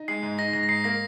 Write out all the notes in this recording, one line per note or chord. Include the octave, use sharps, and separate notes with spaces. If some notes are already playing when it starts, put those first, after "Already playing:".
Already playing: D#4
G#3 C7
G#2
D#4 A#6
G#2 A#6
A#6
G#2 C7
A#3 A#6